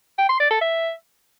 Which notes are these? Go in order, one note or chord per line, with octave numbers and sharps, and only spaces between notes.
G5
C6
D5
A4
E5